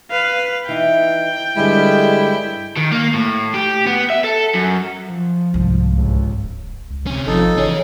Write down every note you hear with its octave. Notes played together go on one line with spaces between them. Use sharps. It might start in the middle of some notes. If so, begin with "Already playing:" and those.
B4 F5
E3 D#4 G5
G2 D3 G3 G#3 E4 G#5
D#3
A#3
A2
G4
B3
E5
A4
F#2
F3
C2 G#2
G1 C#2
D1
C#2
C3 C#4
G#1 F3 D#4 A4
E3 C#4 G#4 C#5